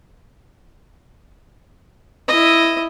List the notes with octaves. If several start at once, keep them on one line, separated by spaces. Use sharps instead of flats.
E4 D#5